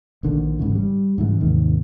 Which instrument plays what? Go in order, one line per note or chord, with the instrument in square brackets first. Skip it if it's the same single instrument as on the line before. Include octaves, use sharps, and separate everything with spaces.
[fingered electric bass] A#1 D3 D#3
G1 G#2 C#3 E3
G3
G#2 C#3 E3
D#2 G#2 C3 D#3